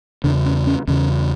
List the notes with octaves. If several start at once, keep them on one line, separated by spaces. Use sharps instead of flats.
E2 C#3 D4
C#4
C#4
E2 C#3 C#4